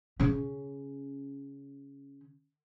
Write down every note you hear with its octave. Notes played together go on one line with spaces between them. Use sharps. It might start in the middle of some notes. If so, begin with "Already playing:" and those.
C#3 C#4